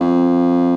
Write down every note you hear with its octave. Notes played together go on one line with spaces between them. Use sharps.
F2